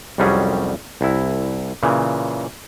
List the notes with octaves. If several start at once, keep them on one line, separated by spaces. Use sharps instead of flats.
C2 F2 F#3 G3 C#4 G#4
C2 E4
A#2 C#3 E3